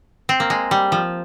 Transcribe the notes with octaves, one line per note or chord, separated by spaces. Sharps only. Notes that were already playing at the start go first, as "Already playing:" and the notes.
C4
A#3
G#3
G3
F3